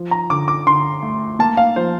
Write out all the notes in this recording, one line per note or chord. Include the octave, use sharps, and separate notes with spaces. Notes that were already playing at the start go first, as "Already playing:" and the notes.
Already playing: F3
A#5
D3 D6
D6
D3 C6
A3
A#3 A5
F5
F3 C5